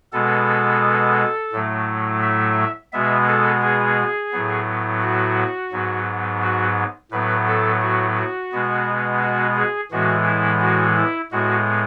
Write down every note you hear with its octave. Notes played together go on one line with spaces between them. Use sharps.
B2 G#3 B3 A4
A2 F#3 A3
E5
B2 G#3 B3 E5
A4
G#4
A2 F#3 B3
F#4
G#2 F#3 B3
F#4
A2 F#3 B3 B4
A4
F#4
F#4
B2 G#3 B3
F#4
G#4
A2 E3 G#3 B3 F#4
E4
F#4
E4
A2 G#3 B3 F#4